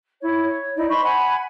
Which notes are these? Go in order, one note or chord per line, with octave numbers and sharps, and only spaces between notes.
E4 C#5
C#5
D#4 E4 D5
C5 D#5 B5 C#6
F#5 G#5 B5